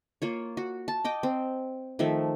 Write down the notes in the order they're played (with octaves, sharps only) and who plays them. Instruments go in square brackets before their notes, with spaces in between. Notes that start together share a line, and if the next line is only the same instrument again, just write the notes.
[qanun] A#3 F4 C#5
F#4
A5
D#5 G5 D6
C4
D#3 F3 A3 E5